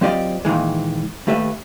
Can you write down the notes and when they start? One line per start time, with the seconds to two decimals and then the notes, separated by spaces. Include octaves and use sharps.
0.01 F#3 C4 F4 G4 D5 D#5
0.45 A#2 D#3 E3 G#3
1.27 D#2 A3 G4 B4 E5